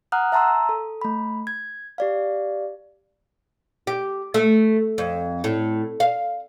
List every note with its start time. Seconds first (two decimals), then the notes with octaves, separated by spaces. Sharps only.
0.12 F#5 A#5 D#6 F6 F#6
0.32 E5 A5 A#5 C6 E6
0.69 A4
1.01 A3 B5
1.47 G#6
1.98 G4 D5 F5
3.87 G4
4.34 A3
4.98 F2
5.44 A2
6.00 F5